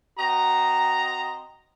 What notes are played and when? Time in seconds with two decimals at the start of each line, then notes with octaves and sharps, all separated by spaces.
0.19 C4 F#4 D#5 A#5